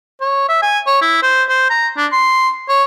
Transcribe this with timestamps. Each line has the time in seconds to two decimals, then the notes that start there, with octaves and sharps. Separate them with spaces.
0.21 C#5
0.49 E5
0.62 G#5
0.87 C#5
1.02 E4
1.23 C5
1.49 C5
1.70 A#5
1.97 D4
2.12 C6
2.69 C#5